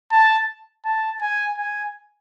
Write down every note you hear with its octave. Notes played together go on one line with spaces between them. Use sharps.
A5
A5
G#5
G#5